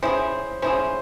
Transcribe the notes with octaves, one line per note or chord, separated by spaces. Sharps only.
C#4 E4 G#4 C5
C#4 E4 G#4 C5